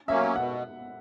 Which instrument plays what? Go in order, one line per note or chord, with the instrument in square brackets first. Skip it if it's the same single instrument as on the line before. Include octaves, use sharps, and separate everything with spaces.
[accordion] F#3 A#3 C#4 [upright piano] E5
[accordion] B2 [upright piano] F#5